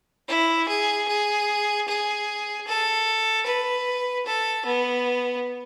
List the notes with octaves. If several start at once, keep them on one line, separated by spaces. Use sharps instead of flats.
E4
G#4
G#4
G#4
A4
B4
A4
B3